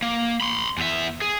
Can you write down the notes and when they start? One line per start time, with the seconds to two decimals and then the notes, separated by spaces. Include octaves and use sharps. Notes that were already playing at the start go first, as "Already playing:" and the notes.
0.02 A#3
0.41 B5 C6
0.78 E2 E5
1.22 G#4